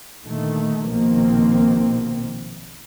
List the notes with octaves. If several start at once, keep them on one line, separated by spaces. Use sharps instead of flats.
A#2 D3 D#3 A3
A#1 B2 D#3 F3 A#3 C4